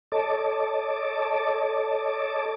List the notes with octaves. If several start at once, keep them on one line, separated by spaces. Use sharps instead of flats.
A4 C#5 D#5 A5 D6